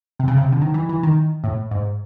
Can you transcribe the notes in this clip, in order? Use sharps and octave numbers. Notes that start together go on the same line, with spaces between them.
C3
C#3
C3
D3
D#3
E3
E3
D#3
A2
G#2